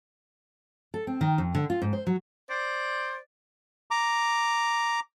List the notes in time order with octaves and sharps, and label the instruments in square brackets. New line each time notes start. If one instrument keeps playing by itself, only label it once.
[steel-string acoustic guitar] A4
C4
D#3
F2
D3
F4
G#2
C5
F#3
[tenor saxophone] C5 [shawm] D5
[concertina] A#5 D6